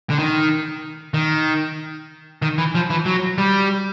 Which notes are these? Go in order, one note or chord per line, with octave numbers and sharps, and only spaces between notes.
D3
D#3
D#3
D#3
E3
F3
E3
F#3
G3